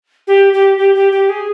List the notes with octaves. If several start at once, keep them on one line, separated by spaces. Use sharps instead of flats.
G4
G4
G4
G4
G4
G#4